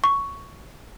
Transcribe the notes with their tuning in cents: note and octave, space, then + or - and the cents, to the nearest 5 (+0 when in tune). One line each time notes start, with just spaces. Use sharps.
C#6 +10